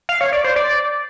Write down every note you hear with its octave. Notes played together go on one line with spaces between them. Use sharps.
F5
C#5
D5
C5
D5